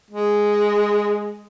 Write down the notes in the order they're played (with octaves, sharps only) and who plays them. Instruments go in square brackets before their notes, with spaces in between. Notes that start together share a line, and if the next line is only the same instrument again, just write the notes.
[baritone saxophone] G#3